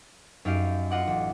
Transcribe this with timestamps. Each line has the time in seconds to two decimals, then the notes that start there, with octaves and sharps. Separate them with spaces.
0.45 F#2 D#4 G4 F5 D7
0.91 F4 D#5 F#5 D6
1.07 A1